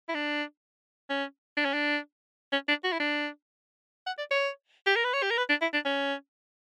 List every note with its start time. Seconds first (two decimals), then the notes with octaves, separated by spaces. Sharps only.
0.09 E4
0.15 D4
1.10 C#4
1.57 D4
1.65 C#4
1.74 D4
2.53 C#4
2.68 D4
2.84 F#4
2.92 E4
3.00 D4
4.07 F#5
4.18 D5
4.31 C#5
4.87 G4
4.96 A#4
5.04 B4
5.14 C#5
5.23 G4
5.31 A#4
5.38 B4
5.49 D4
5.62 E4
5.74 D4
5.85 C#4